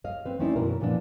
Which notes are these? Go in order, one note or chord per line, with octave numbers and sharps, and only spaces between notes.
C#5 D#5 F5
C4 B4
A3 C4 C#4 D#4 E4 D5
F#2 B2 E3 A#4
A#2 E3 F3 B3 D4